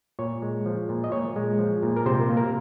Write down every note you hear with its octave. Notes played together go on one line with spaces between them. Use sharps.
A#2 C#5
G#3
F3
A#2
D#5
A#2 C#5
G#3
F3
A#2
A#4
C3 C5
A#3
A#4